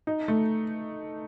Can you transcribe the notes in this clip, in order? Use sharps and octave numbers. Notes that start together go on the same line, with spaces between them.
D#4
A3